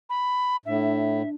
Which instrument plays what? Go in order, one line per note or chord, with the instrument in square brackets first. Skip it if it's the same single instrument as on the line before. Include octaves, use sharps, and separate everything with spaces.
[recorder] B5
[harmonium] A2 [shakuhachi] D4 [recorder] E5